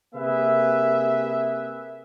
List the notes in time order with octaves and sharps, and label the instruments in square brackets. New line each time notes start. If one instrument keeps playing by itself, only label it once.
[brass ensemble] C3 A#3 G#4 B4 E5